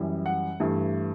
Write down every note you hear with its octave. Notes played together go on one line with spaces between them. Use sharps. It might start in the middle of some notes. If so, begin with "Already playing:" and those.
Already playing: F#2 E3 G3
F#5
G2 E3 A3